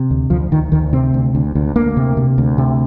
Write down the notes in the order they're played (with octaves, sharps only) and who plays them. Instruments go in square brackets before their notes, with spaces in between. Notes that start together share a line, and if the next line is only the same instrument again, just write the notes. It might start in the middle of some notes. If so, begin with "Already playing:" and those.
Already playing: [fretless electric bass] C3
D2
D2 F3
D2 D#3
D2 D#3
C3 C4
D2
D2
D2
D2 A#3
C3
C3
D2
C3